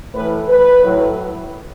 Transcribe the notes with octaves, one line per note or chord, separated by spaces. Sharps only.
A2 E3 B4
B4
A2 F#3